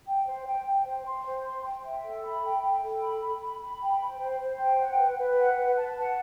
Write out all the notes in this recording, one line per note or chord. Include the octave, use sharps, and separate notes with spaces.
G5
C5
G5
G5
C5
C6
C5
C6
G5
E5
A4
B5
G5
G5
A4
B5
B5
B5
B5
G5
C5
C5
C5
G5
F#5
B4
B4
F#5
B4
A5
F#5